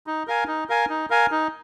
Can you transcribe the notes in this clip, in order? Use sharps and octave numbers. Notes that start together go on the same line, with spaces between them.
D#4
A#4 F5 G#5
D#4
A#4 F5 G#5
D#4
A#4 F5 G#5
D#4